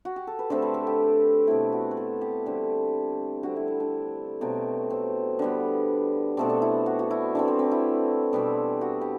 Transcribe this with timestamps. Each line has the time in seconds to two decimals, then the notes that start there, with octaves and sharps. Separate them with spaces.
0.05 F#4
0.16 G4
0.27 A4
0.39 B4
0.50 D3 A3 C4 C5
0.62 B4
0.74 A4
0.87 G4
1.47 B2 A3 C4 E4
1.72 F#4
1.91 B4
1.97 A4
2.21 G4
2.46 D3 G3 C4
3.43 D3 G3 C4 F#4
3.56 E4
3.68 E4
3.80 D4
4.41 B2 F#3 A3 C4
4.90 C4
5.39 D3 G3 B3
6.37 B2 A3 C4 D4
6.50 D4
6.62 E4
6.86 F#4
6.99 F#4
7.11 E4
7.35 E3 A3 C4 D4
7.48 C4
7.59 C4
7.71 E4
8.33 B2 G3 C4
8.81 F#4
9.01 G4